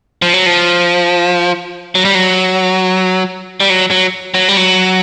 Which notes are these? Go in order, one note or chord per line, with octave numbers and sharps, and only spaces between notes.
F3
F#3
F3
F#3
G3
F#3
G3
F#3
F#3
F#3
G3
F#3